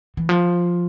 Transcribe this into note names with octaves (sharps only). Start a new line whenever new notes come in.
E3
F3